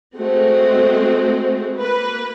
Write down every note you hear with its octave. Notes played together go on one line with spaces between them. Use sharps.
G#3 A3 C4 F#4
A#3 B4